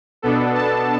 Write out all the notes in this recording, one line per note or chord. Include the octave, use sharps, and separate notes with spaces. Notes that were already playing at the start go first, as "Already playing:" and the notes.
B2 B3 D4 A4
A5